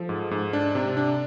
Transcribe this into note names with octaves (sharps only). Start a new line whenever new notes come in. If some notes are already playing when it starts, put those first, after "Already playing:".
Already playing: F3 A4
G#2
G#2
D4
C3
D4